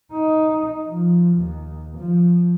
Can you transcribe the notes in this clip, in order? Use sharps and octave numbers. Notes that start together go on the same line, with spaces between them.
D#4
F3
D#2
F3